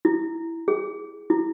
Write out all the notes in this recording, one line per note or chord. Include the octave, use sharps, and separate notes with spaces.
E4
G#4
E4